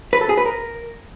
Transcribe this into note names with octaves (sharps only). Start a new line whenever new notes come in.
B4
A4
G#4
B4
A#4